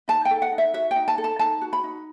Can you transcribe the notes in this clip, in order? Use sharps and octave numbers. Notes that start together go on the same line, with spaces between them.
D#4 A5
G5
A4
F#5
D#4
E5
F#4 E5
G5
D#4
A5
A4
A5
D#4 A5
F#4
B5
D#4